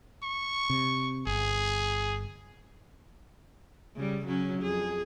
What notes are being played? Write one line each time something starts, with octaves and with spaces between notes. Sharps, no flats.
C#6
C3
G1 G#4
C#3 G3
C#3 F#3 C#4
F2 G#4